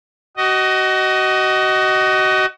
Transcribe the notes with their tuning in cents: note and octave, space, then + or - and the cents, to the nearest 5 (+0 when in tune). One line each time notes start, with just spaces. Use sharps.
F#4 +30 D#5 +0